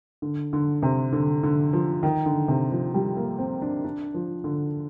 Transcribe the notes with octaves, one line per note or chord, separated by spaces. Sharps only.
D3
D3
C3
D3
D3
F3
D#3
D3
C3
F3
G3
A#3
C4
D4
D4
F3
D3